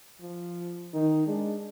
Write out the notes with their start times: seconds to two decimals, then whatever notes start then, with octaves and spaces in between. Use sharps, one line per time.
0.22 F3
0.94 D#3 D#4
1.27 G#3 D4